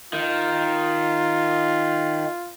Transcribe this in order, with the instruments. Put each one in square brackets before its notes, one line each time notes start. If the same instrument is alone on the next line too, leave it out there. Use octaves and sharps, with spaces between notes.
[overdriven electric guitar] D#3 [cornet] F4